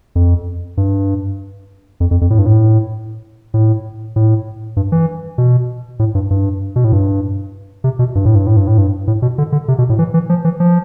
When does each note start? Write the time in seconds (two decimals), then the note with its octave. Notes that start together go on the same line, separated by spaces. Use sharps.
0.15 F2
0.77 G2
2.00 F2
2.11 F2
2.21 F2
2.30 A2
2.39 G2
2.46 A2
3.54 A2
4.16 A2
4.77 G2
4.92 E3
5.38 B2
5.99 A2
6.15 G2
6.30 G2
6.76 B2
6.84 A2
6.92 G2
7.84 C3
7.99 B2
8.15 G2
8.25 A2
8.35 G2
8.47 A2
8.57 G2
8.67 A2
8.78 G2
9.07 A2
9.22 B2
9.38 D3
9.52 D3
9.68 C3
9.78 B2
9.89 A2
9.99 E3
10.14 E3
10.29 F3
10.45 E3
10.60 F3